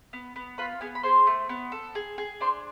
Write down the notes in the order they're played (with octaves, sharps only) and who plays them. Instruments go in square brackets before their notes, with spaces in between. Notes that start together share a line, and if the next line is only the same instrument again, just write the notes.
[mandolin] B3
B3
F4 B4 B5
B3 G#4 G#5
B5
G#4 C5 C6
A3
B3
A4
G#4
G#4
D4 C5 C6